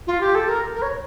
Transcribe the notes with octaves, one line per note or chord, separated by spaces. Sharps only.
F4
G4
A4
A#4
A#4
C#5